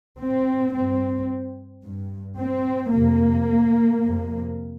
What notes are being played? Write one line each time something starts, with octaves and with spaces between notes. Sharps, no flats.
C4
G2 C4
G2
C4
F2 C3 A#3
F2 C3